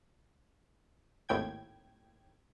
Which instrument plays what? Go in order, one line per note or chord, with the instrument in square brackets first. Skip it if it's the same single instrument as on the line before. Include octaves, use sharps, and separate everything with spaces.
[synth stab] G#1 D#2 A2 G5 G#6